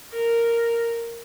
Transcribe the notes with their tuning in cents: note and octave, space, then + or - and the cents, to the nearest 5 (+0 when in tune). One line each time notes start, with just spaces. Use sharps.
A#4 -5